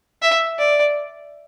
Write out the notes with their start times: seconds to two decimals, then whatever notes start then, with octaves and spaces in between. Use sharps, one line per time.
0.22 E5
0.59 D5